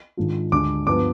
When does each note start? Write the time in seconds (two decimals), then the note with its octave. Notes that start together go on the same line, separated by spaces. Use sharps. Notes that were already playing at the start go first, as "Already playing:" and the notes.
0.17 G#2 D#3 G#3 D4 F4
0.52 D2 D3 G#3 D4 D6
0.87 G2 F3 B3 D6